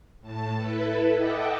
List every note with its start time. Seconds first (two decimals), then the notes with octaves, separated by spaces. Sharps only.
0.21 A2 A5
0.57 E4 A4 B4
1.16 D#5 E5 F#5 G5 A5 D6